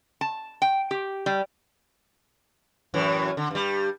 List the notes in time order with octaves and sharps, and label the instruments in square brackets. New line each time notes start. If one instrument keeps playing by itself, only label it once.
[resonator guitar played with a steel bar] A5
G5
G4
G3
[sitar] F#2 A2 E3
D3
G2 G3